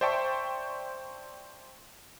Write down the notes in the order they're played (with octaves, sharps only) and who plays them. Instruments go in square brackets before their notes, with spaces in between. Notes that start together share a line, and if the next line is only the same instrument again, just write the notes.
[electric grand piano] C5 D5 E5 G5 A5 C#6